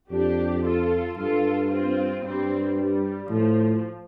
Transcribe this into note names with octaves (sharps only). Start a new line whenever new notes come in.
F2 D4 G4
F4 A4
G2 F4 A4
C4 F4
G2 G3 C4
G3
A2 F3